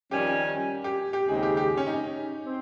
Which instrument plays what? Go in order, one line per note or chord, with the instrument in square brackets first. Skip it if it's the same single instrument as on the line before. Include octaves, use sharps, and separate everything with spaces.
[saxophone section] F2 D#3 G3 C#4 [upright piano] G4
[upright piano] G4
G4
[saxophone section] D#2 C#3 G#3 C4 D#4 [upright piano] G#4
[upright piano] G4
G4
C#4
D#4
[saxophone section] C4